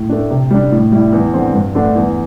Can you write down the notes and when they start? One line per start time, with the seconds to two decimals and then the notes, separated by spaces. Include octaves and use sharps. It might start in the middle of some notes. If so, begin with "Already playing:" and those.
Already playing: A2
0.09 A3 D4
0.31 C3
0.51 G3 D4
0.72 A2
0.92 G3 E4
1.12 E2
1.34 D3 C4
1.54 G2
1.75 D3 A3 D4
1.95 E2